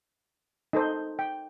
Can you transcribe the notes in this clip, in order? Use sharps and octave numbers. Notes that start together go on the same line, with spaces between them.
D#4 A4 C5 D#5
G5